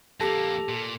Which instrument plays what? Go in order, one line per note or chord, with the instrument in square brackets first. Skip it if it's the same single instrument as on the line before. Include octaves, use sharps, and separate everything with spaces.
[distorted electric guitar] F2 A#3 [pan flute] G4 [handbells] A4 A5 A#6
[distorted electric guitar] A#2